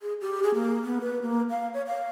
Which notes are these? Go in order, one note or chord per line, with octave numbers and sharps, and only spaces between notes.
G#4
G4
G#4
A#3
B3
B4
A#3
F5
C#5
F5